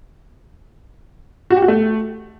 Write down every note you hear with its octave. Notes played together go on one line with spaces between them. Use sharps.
F#4
G4
F#4
A3